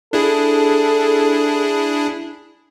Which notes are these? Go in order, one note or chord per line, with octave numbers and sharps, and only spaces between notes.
D4 E4 G#4 A4